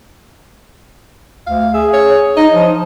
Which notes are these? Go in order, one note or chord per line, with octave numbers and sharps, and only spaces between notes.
D2 F5
G#4 E5
C#5
D#4 D#5
F3